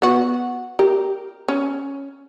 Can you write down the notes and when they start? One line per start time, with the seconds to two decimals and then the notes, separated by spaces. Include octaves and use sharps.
0.02 B3 F#4
0.79 G4 A#4
1.48 C#4